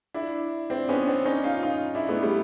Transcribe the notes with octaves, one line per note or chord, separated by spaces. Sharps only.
D4 E4
C4 D4
B3 C#4
C4 D4
C#4 D#4
D#4 F4
D#4 F4
D4 E4
A3 B3
G3 A3